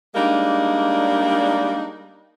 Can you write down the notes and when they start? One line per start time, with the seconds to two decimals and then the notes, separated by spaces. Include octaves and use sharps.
0.15 G3 G#3 A#3 D4 D#4